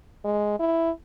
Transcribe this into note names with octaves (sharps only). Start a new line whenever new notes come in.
G#3
E4